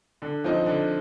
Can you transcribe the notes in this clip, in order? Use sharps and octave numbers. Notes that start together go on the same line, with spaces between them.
D3
F3 C4 D#4
D3